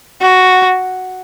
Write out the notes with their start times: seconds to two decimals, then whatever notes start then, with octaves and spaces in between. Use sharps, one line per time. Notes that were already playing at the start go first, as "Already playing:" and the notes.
0.21 F#4